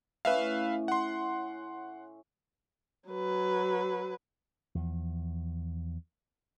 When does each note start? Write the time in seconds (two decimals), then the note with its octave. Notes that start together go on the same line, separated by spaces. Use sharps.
0.25 A2 C#4 B4 E5 F5
0.88 F#5 C6
3.09 F#3 B4
4.75 E2 F3